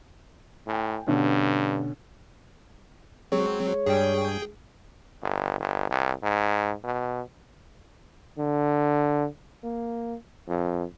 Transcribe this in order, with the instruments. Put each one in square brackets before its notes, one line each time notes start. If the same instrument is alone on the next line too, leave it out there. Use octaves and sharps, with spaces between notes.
[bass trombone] A2 [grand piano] G5 G#5
[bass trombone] G2 [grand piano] B2 D3 C#4
[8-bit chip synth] F#3 C4 [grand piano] G#3 [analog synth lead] C#5
[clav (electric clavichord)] G2 G3 [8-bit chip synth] G#4 G5
[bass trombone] G1
G1
C2
G#2
B2
D3
A#3
F2